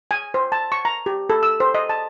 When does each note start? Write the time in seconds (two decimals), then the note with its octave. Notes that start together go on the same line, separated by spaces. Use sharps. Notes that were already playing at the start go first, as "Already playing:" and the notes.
0.11 G#5
0.34 C5
0.52 A5
0.72 C#6
0.85 A#5
1.06 G4
1.30 A4
1.43 E6
1.60 C5
1.74 D#5
1.89 A5